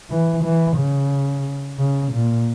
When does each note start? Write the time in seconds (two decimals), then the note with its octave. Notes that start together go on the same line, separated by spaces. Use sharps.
0.10 E3
0.44 E3
0.77 C#3
1.79 C#3
2.12 A#2